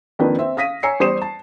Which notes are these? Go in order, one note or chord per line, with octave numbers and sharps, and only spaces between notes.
F2 D#3 A#3 D4 B4
C4 E5
F5 D#6 A#6 B6 D#7
C#5 G#5 A#5 E6 C7 C#7
E2 G3 C5 D#6 C7 E7
A5